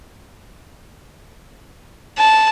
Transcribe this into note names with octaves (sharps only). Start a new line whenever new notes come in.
A5